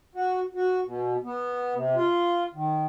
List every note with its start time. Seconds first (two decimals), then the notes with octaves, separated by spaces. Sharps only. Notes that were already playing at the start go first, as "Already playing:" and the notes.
0.15 F#4
0.55 F#4
0.86 B2
1.24 B3
1.75 C3
1.96 F4
2.54 D#3